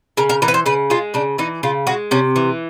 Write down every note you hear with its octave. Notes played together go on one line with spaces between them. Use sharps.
C#3 A#4
A#4
E3 A#4
B4
C5
C#3 B4
G#3 F4
C#3 D4
E3 D#4
C#3 F4
G#3 F#4
C3 C#4
E3